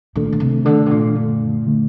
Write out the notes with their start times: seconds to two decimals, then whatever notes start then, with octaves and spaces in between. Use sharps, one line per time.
0.16 A#2 D#3 A3 D4 A4
0.33 A#2
0.40 C3
0.65 D3 D#3 A3 D4 A4
0.86 C3
0.91 A#2
1.15 F#2 D3 A3
1.66 D3 A3